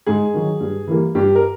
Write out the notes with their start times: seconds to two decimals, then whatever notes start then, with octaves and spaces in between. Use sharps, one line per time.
0.06 G#2 G#4
0.34 D#3 F#3
0.60 G2
0.87 E3 G3 A#3
1.15 G2 G4
1.35 A#4